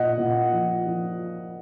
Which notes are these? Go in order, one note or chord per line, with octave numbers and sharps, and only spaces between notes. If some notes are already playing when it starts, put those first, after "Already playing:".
Already playing: A#2 D#5 F#5
A#2
F3
F3